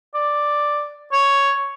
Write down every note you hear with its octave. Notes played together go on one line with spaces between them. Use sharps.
D5
C#5